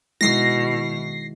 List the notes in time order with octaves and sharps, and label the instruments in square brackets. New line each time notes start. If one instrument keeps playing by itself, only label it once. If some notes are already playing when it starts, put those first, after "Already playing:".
[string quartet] B2 [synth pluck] D#3 G#3 E4 [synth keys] A#6 C7